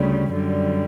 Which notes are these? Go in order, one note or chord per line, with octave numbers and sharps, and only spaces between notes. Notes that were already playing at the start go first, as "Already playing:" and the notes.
Already playing: D2 C#3 G3
F#2 D3 G3